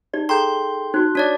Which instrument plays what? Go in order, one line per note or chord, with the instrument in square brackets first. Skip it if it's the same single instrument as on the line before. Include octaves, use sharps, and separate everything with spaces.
[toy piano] D#4 G4 D5
[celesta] G#4 A4 G5 [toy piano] A#5 [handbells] C6 G6
[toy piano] D#4 F#4 [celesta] F#6
[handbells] D4 C#5 D5